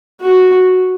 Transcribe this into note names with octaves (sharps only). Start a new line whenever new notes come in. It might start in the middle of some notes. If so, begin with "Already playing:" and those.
F#4